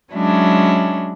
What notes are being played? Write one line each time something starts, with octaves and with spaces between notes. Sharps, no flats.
F#3 G#3 C#4 D4 E4